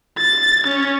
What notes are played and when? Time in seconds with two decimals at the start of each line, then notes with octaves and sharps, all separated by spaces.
0.18 A6
0.67 C#4